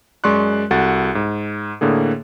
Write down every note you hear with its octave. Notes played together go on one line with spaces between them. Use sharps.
F#2 G#3 D5 C6 C#6 F#6
C2 F#4 A4 F#5 A6
G#2
A2 D3 A#3 G#4